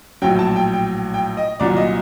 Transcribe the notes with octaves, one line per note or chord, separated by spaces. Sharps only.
A#1 A2 F#3 G5
A5
G5
G5
G5
D#5
C2 A#2 F#3 D5
D#5